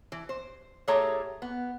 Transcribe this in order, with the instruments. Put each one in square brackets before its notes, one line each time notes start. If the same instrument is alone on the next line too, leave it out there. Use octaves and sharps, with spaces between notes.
[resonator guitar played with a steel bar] E3
C5
A2 A3 G4 G#4 C#5 A#5
B3